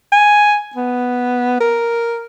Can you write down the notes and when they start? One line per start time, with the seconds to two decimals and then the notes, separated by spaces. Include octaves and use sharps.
0.12 G#5
0.75 B3
1.60 A#4